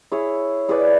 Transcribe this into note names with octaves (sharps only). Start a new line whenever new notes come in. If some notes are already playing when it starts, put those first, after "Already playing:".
E4 G#4 C#5
E4 G#4 B4 D5